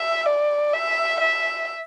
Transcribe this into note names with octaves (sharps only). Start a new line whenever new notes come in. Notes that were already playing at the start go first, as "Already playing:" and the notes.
Already playing: E5
D5
E5
E5